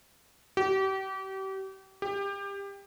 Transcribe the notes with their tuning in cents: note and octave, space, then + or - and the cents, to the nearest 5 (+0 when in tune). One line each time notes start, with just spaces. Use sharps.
G4 -35
G4 +20